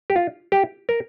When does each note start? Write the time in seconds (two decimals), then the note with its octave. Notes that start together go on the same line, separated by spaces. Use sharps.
0.10 G4
0.16 F4
0.52 G4
0.89 A#4